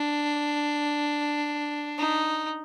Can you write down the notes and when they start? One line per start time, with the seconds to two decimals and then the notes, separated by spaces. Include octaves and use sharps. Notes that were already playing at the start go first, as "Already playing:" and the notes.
Already playing: D4
1.99 D#4